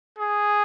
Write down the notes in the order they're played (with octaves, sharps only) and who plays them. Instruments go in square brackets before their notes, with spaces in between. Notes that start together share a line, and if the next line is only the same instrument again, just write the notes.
[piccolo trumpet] G#4